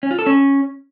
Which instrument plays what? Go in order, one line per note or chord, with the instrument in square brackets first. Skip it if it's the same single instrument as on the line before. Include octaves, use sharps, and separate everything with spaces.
[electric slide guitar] C#4
F4
A4
C#4